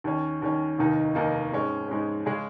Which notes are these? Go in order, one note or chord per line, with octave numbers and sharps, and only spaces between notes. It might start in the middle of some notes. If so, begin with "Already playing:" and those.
D#2 D#3 C#4
D#2 D#3 C#4
F1 D#2 D#3 A#3 D#4
F1 D#2 D#3 A#3 D#4
G#2 G#3 C#4
G#2 G#3 C#4
C#3 G#3 C#4 G#4